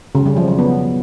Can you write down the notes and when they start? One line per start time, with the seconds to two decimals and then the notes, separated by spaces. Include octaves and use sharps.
0.15 C#3
0.26 G3
0.37 F3
0.48 F#3
0.59 B3